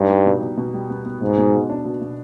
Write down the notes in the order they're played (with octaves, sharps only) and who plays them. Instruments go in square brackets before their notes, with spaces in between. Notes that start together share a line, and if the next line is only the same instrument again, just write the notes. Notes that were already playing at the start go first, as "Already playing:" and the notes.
Already playing: [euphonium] G2 [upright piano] D#4
[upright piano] G3
B2
B2
B2
G3
B3
B3
[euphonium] G#2 [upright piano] B2
[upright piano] B2
B2
D4
B2
B2